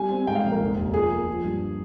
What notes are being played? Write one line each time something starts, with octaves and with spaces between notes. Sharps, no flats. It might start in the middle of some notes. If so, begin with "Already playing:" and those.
Already playing: G3 G#5
C4
G#2 G5
F5
A#1
A#4
F1
D#2
F3 G#4
A#3
F3
G2